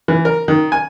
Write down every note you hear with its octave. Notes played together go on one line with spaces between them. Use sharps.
E3
A#4
D#3
G#5